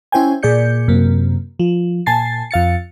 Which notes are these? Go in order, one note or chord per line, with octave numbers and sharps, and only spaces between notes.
C#4 E4 C5 G5 G#5
A#2 G#4 D5 G6 C#7
F#2 C3 A#3
F3
A#2 G#5 A5 A6 C7
F2 F5 A6 C#7